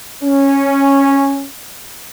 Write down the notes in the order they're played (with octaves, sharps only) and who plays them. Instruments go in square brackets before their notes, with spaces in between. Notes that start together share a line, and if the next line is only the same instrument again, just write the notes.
[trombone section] C#4